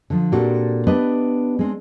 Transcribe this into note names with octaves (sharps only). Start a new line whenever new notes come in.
D3 F3
A#2 C4 D4 F#4 G4 A4
B3 D4 G4 B4 D#5
G#3 C4 D4